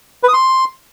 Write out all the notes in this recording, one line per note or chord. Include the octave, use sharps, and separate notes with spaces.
B4
D#6
C6